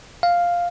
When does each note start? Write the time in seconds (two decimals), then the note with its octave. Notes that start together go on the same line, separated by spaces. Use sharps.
0.23 F5